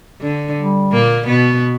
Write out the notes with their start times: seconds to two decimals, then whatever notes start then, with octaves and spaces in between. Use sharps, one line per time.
0.21 D3
0.57 G3
0.92 A#2 A#3
1.27 B2 B3